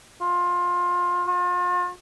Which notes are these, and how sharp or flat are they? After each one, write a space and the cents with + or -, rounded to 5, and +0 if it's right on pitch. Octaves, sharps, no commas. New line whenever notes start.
F4 +20
F4 +40